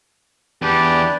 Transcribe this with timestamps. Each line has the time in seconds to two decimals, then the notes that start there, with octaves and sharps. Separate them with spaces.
0.62 E2 E3 D4 G4 B4 D5